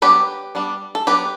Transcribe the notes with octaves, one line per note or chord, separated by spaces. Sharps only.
F#3 B3 D4 G4 B4
G3 B3 D4
A4
F#3 B3 D4 G4 B4